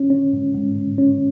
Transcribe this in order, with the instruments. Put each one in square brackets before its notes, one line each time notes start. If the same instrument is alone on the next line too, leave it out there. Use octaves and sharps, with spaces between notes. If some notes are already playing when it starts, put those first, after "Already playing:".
Already playing: [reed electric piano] C#4
C#4
G#2
G#2
G#2
C#4